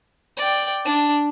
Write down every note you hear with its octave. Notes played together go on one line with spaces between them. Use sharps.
D5 G5
D4